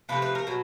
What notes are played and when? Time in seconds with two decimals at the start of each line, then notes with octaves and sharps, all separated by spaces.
0.09 C3 F3 A3 B4
0.22 B4
0.35 A#4
0.47 B2 F#3